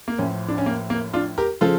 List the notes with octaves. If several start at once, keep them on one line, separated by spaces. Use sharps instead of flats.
A#3
A1 A2 F3 C#4
D4
C#4
A#3
A#3
D4 F4
G4 A#4
C#3 F3 F4 A4